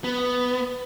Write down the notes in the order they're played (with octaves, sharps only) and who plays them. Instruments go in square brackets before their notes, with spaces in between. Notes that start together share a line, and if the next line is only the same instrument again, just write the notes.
[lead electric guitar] B3